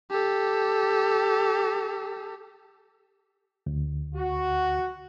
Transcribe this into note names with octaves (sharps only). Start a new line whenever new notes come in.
G4 A4
D2
F#4